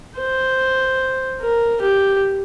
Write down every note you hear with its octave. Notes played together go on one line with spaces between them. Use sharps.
C5
A#4
G4